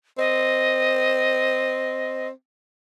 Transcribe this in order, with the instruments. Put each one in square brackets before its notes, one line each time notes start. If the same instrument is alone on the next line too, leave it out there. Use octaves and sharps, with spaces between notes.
[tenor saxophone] C4 [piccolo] D#5